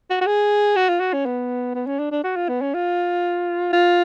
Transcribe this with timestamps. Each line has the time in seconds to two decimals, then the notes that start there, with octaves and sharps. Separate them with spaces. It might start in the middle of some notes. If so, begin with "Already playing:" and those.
0.10 F#4
0.21 F#4
0.27 G#4
0.76 F#4
0.88 F4
1.00 F#4
1.13 C#4
1.26 B3
1.75 B3
1.87 C#4
1.99 D4
2.12 D4
2.24 F#4
2.36 F4
2.49 B3
2.61 C#4
2.74 F4
3.73 F4